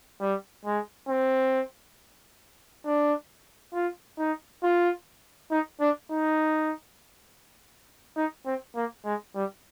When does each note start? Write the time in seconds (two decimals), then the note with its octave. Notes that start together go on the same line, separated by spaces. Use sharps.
0.21 G3
0.65 G#3
1.09 C4
2.86 D4
3.74 F4
4.19 D#4
4.63 F4
5.51 D#4
5.81 D4
6.11 D#4
8.17 D#4
8.46 C4
8.76 A#3
9.05 G#3
9.35 G3